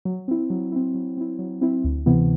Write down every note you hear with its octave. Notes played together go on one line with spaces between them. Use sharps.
F#3
C4 E4
F#3
C4 E4
F#3
C4 E4
F#3
C4 E4
D2
C3 E3 B3 E4